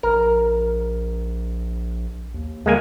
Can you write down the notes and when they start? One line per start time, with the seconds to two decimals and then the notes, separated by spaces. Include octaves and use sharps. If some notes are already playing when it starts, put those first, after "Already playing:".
0.03 A#1 A#4
2.34 D#2
2.66 D3 G#3 A#3 G#5